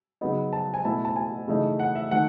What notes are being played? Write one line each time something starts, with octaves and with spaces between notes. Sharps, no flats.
C#3 F#3 B3 D#4
A5
G#5
B2 A3 E4 A5
A5
G#5
C#3 E3 A3 D#4
F#5
E5
D#3 A3 F#5